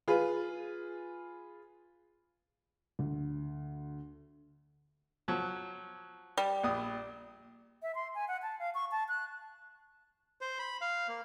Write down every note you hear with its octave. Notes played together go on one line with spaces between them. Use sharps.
F4 G#4 B4
D2
F3 F#3
G3
A#1 D#6
E5
C6
G#5
F#5
A5
F5
C#6
A5
F#6
C5
B5
F5
A#3